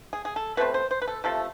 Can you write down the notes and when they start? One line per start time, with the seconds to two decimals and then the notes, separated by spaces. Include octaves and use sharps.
0.13 G#4
0.25 G#4
0.36 A4
0.57 B2 A3 C4 B4
0.74 C5
0.91 C5
1.02 B4
1.07 A4
1.24 C3 F3 A3 A4